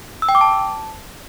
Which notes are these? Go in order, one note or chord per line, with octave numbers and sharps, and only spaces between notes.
E6
G5
D6
A5